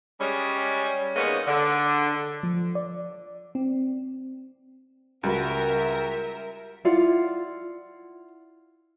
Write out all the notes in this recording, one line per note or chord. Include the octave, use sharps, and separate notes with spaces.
G3 G#3 C#4
C#3 G#3 A#3 B3 C#4 D#4
D3
F3
D5
C4
C#2 G3 F#4 A#4 B4 E5
E4 F4 D5 F#5